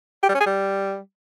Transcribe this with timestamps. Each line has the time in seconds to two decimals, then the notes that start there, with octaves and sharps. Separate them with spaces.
0.23 G4
0.29 G3
0.34 C#4
0.40 G#4
0.46 G3